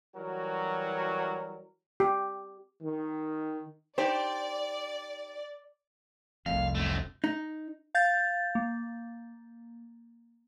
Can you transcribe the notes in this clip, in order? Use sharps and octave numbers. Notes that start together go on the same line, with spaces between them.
E3 F#3 G3 F#4 A#4
G4
D#3
D#4 G4 C5 D5
F1 C2 F2 F5
F#2 A3
D#4
F5 G6 A6
A#3